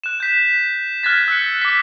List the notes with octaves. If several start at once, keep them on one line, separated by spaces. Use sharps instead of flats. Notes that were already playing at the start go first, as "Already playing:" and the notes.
F#6 E7
G6 B6
F6 F#6 G#6 A6 B6
E6 F#6 C#7
D6 B6